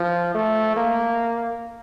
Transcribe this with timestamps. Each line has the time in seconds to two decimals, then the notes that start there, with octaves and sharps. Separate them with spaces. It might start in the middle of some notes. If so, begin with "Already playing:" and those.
Already playing: F3
0.35 A3
0.77 A#3